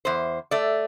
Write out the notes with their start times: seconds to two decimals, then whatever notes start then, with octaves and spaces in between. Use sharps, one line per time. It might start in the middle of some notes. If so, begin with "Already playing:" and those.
0.05 E2 C5
0.51 A3 D5